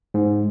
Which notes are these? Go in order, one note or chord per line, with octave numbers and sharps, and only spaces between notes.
G#2